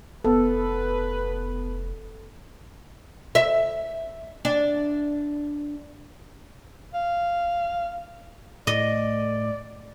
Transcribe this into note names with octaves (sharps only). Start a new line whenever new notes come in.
F1 B3 A4 B4
E5
D4
F5
A2 D5 D#5